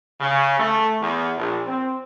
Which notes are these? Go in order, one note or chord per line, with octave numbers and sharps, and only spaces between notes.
C#3
A3
E2
A#1
C4